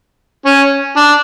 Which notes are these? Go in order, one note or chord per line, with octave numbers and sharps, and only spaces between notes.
C#4
D4